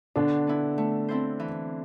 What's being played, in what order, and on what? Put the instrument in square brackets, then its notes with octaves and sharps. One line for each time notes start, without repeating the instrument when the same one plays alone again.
[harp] B2 [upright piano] D3 D4
[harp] B3 E4
A3
C4 E4 A4 C5
E3